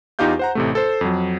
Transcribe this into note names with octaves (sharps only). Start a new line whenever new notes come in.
E2 D#4 F4 G4 F5 G6
C5 F#5 A#5
A1 C3 A3
A4 C5
F2 F#3